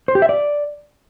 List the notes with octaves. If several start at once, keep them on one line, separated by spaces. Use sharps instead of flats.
C5
G4
E5
D5